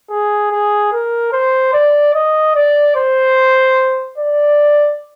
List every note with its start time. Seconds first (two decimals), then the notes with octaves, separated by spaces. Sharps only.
0.10 G#4
0.51 G#4
0.92 A#4
1.32 C5
1.73 D5
2.14 D#5
2.55 D5
2.96 C5
4.18 D5